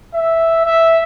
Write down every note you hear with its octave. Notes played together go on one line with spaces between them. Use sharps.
E5
E5